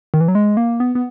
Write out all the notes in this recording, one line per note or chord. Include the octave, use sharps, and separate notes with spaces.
D#3
E3
F#3
G#3
A#3
B3
B3